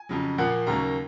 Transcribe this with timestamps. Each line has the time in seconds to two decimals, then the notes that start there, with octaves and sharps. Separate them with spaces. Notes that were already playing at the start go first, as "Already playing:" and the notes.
Already playing: G#5
0.09 F2 C#3 F#3
0.38 A#2 F3 A#3 F#5
0.67 D#2 C#3 F#3 A#3 A#5